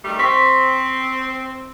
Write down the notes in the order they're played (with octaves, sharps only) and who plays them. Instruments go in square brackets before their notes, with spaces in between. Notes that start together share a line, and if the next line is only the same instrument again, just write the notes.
[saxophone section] D#3 G3 A3
[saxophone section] C4 [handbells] C6 C#6 B6